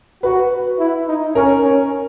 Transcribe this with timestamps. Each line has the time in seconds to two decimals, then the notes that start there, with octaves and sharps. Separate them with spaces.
0.23 F#4 B4
0.79 E4
1.08 D#4
1.35 C#4 A#4
1.63 C#4